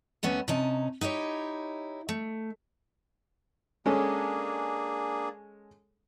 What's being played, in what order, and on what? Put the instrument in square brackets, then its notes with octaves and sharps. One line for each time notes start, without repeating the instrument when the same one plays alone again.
[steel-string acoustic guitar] D#2 A3 B3 C#4
C3 C#4 D#4 A5
D#4 E4 G4 C#5
A3
[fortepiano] G#3 C#4 A4 [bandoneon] A#3 D4 G#4